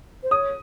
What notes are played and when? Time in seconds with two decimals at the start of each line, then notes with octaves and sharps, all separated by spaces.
0.23 C5
0.31 C#5 D#6